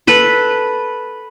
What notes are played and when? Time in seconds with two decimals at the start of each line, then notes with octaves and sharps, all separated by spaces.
0.07 A4 B4